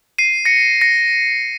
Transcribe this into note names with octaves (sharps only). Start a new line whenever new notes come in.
C7 D#7
A#6 C#7
A#6 C#7